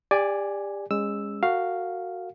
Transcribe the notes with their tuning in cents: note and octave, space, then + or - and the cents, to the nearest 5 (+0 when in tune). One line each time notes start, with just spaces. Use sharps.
G4 +35 D5 +0 G#5 +0
G#3 -25 C#4 +0 E6 +0
F#4 +0 A#4 -40 F5 +0